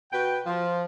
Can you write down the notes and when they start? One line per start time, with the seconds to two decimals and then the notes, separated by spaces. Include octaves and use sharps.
0.12 B2 F#4 B4 G5
0.46 F3